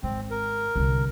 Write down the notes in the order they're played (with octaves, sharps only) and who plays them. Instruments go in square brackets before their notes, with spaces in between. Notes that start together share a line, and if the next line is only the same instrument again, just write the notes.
[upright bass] G#1 [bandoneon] C4
[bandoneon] A#4
[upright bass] C2 D3